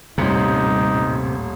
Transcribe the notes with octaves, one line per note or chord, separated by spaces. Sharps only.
D#1 A1 C3 G3 C#4 D#4